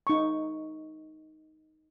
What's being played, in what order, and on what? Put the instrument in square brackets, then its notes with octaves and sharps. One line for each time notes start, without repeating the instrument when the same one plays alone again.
[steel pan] D#4 C#6